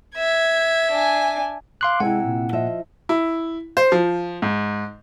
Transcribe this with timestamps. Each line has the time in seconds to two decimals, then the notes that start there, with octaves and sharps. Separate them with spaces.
0.17 E5 G#6
0.92 D4 G#5
1.81 F5 C6 D6 F#6
2.00 C3 G#3 E4 F#5 G#5
2.25 A#2
2.53 F3 D#5 E5
3.09 E4
3.77 C5
3.92 F3
4.42 G#2